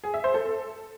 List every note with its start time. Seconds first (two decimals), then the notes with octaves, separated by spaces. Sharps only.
0.04 G#4
0.14 E5
0.24 C5
0.34 A4